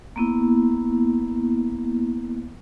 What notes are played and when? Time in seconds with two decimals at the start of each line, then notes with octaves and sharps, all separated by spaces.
0.16 A#3 B3 E4